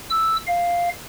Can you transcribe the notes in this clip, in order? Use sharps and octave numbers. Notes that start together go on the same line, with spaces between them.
E6
F5